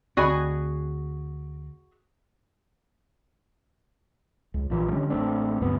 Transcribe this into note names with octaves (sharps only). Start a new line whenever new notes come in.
D2 C4 F#4 G#4 D5 D#5 G#5 B5
C#2
A#1 A#2 E3 F3
D3 G3 C#4
A1 A3 C4 D4
D2 G2 F#3 B3